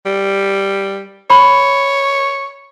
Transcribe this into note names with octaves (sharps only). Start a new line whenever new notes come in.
G3
C#5 B5